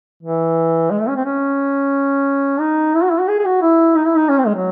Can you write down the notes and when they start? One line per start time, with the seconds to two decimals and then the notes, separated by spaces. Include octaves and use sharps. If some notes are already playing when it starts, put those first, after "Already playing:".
0.23 E3
0.91 G#3
1.00 A3
1.08 C#4
1.16 C4
1.25 C#4
2.61 D#4
2.95 E4
3.03 F#4
3.11 E4
3.20 F#4
3.28 G#4
3.39 G#4
3.45 F#4
3.62 E4
3.96 D#4
4.06 E4
4.17 D#4
4.29 C#4
4.38 C4
4.47 G#3
4.55 F#3